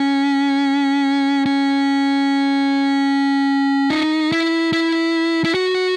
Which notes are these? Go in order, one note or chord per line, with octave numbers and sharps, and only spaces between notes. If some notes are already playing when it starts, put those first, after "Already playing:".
Already playing: C#4
C#4
D#4
E4
E4
E4
F#4